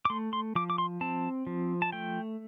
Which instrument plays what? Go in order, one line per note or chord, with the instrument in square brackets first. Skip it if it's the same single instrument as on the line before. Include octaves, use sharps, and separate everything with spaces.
[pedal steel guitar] D6
A3 C6
C6
F3 D6
D6
C6
C4 A5
F3
A5
A3 G5